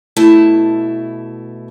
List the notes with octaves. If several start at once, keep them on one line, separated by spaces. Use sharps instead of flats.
B2 A3 E4 A5